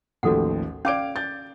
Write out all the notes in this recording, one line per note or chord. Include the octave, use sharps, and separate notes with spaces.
A1 D#2 F3 F#4 A4 F#5
C#4 D5 F5 D6 D7
G6 A6